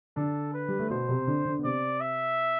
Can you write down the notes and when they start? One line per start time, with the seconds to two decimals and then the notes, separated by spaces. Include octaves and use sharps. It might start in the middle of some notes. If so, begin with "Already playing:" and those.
0.16 D3 D4 A4
0.53 B4
0.68 G3
0.79 A3
0.90 B2 B3 C5
1.08 C3 C4
1.27 D3 D4
1.45 D3 D4
1.59 B3
1.63 C3 C4 D5
2.00 E5